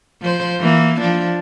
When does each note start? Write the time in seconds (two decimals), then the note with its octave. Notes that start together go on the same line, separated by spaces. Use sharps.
0.21 F3 C5
0.61 E3 A#3
1.01 F3 D4